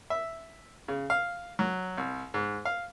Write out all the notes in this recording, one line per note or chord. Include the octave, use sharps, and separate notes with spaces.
E5
C#3
F5
F#3
C2
G#2
F5